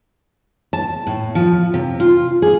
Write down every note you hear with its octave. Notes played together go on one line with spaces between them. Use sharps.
A5
A2
F3
C3
F4
G#4